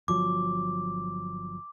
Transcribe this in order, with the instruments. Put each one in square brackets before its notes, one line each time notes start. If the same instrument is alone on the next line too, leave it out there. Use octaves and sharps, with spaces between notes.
[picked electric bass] G1 F3 F#3 [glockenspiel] D6